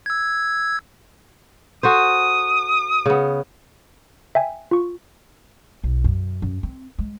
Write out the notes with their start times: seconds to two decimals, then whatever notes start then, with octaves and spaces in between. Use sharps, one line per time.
0.06 E6 G#6
1.83 F#4 A4 C5 D#6
3.06 C#3 B3
4.35 E5 G5 G#5
4.71 F4 C#6
5.84 B1
6.04 F#2
6.42 F#2
6.63 C4
6.98 G#3